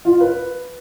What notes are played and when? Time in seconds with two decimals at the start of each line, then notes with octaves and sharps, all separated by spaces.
0.05 F4
0.20 B4